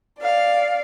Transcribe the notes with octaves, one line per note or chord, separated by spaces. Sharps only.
D5 F5